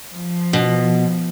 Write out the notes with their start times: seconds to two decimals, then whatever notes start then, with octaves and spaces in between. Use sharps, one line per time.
0.11 F3
0.53 B2